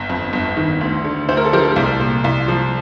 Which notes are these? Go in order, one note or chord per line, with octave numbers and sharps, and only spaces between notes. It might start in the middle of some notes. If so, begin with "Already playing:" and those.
Already playing: G1
F2
G1
D#3
D2
D3
D2 C5
A#4
A4
F3 G4 A#4
C2
A#2
C2
F3